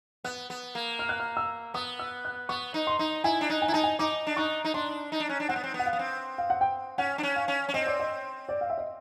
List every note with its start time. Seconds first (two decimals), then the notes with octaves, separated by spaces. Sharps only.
0.24 B3 F#6
0.50 B3
0.75 A#3
0.99 F6
1.09 F#6
1.20 F6
1.37 E6
1.74 B3 D#6
1.99 E6
2.25 F#6
2.49 B3 C#6
2.74 D#4
2.87 C6
2.99 D#4
3.24 E4 G#5
3.41 D4
3.50 D#4
3.62 G#5
3.68 E4
3.72 D#4 A5
3.83 G#5
3.99 D#4 D6
4.27 D4
4.37 D#4 C#6
4.65 D#4
4.74 D4 C6
5.12 D#4
5.20 D4
5.29 C#4
5.40 D4
5.49 C4 F#5
5.56 B3
5.64 C4
5.74 B3
5.79 F#5
5.86 F5
5.93 B3
5.99 C4
6.38 F5
6.50 F#5
6.61 G5
6.98 C#4 F#5
7.18 D4
7.23 C#4
7.36 F5
7.48 C#4
7.69 C#4
7.74 C4 D#5
7.86 D5
7.99 D#5
8.49 D5
8.61 F5
8.70 E5
8.78 D#5